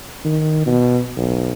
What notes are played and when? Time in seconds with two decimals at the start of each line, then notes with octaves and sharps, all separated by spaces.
0.24 D#3
0.66 B2
1.16 B1